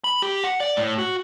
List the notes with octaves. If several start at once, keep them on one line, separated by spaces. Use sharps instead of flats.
B5
G4
F#5
D5
A2
F#4